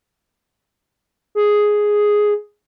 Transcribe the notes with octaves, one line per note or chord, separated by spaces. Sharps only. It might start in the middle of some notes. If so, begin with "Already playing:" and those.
G#4